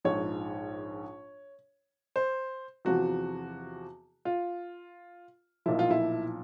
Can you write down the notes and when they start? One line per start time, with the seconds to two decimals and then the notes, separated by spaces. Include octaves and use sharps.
0.05 A#1 G#2 F3 C#5
2.16 C5
2.85 E2 C3 F3 F#4
4.25 F4
5.66 B1 A#2 F3 E4
5.79 F4
5.91 E4